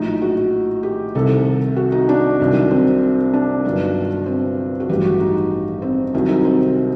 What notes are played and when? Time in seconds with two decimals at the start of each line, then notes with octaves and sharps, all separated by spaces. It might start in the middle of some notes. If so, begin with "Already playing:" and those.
Already playing: A#1 A2 F#3 D#4
0.22 F#4
0.83 G4
1.15 C2 C3 D#3 A4
1.76 F#4
1.92 D#4
2.09 D4
2.40 C2 C3 D#3 F#3
2.71 C4
3.34 D4
3.64 G1 G2 D#3 F#3
4.26 C4
4.80 F#4
4.89 A1 G2 F#3 G4
5.05 F#4
5.20 D#4
5.82 C4
6.14 C2 C3 D#3 F#3
6.29 D#4
6.45 C4